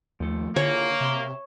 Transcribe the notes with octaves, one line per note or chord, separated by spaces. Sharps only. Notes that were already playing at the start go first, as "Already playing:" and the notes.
D#2 F3 A3
D3 A#3 E4 F4 G#4 C#5
C3 E5 C6